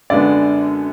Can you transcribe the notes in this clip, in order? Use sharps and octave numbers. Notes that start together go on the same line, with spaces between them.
F#2 D3 G#3 B3 D5